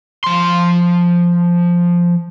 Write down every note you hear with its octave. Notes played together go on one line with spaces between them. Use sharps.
F3 C6